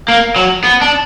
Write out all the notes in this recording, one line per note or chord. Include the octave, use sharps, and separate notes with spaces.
A#3
F#3
B3
D4